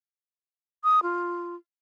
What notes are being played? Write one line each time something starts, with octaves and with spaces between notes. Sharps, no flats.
D#6
F4